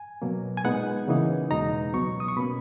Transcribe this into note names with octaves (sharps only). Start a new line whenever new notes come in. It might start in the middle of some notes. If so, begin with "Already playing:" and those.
Already playing: G#5
B2 F#3 A#3
G#5
A#2 G#3 B3 D#4 F#5
C#3 E3 A#3 D#4
E2 B2 G#3 D#4 A#5
C#2 B2 F#3 B3 C#6
D#6
C#6
B2 A#3 C#4 B5